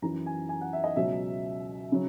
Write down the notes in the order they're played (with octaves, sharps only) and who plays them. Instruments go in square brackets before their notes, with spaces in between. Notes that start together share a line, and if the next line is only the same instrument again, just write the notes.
[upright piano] F#2 E3 A#5
G#5
G#5
F#5
E5
D#5
C#2 B2 F#3 E5
C#3 F#3